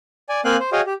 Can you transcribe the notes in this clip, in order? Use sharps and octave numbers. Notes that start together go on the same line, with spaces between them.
D5 G#5
A#3 C4 F5 G5 G#5 F#6
C5
F#4 G#4 C#5 D#5 F5 G5
G4